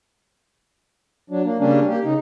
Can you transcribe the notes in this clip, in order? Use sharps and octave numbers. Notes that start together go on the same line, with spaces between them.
F#3 D4
A#3
C#3 G3 A#3 C#4 D4
A#3 G4
C#3 D#4